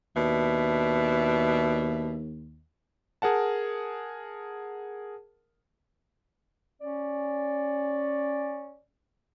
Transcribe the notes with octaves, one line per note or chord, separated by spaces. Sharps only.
D#2 B2 D4 E5
G#4 A#4 F#5 A5
C#4 D5